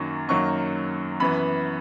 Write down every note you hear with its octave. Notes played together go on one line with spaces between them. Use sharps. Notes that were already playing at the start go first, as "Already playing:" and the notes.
Already playing: F#2 D#3 F#3 A#3 C#6
F#2 D#3 F#3 A#3 C#6
F#2 E3 B3 B5